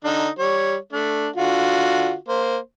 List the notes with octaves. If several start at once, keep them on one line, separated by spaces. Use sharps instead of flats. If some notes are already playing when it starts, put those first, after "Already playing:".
D3 D#4
G3 C#5
A3 D4
D3 F4 F#4
A#3 C5